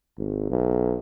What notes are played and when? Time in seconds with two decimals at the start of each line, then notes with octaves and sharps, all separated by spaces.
0.18 G#1
0.50 B1